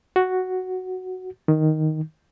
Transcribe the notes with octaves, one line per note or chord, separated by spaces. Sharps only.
F#4
D#3